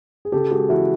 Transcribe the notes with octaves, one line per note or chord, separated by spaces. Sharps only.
G#4
C#3 G4 A4
G#3 F#4 G#4
E3 E4 F#4